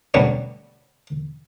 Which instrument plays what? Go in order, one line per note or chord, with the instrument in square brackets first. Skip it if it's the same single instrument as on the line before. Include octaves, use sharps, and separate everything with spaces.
[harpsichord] D2 B2 F#3 G3